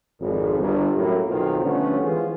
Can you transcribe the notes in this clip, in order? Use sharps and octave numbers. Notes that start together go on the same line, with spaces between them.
G#1 F2
G1
F#2 A2 A3 A#3 E4
B1 F2 A#2 D#3 C4 F4
D3 F3 G3 A3 B3 C#4
E3 F3 G#3 F4 G#4 C5